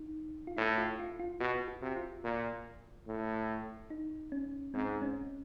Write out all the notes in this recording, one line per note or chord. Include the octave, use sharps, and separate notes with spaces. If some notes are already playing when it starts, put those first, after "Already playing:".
Already playing: D#4
F4
A2 E4
F4
F4
F4
B2 F#4
F#4
C3
F4
A#2
A2
D#4
C#4
G#2 C4
C#4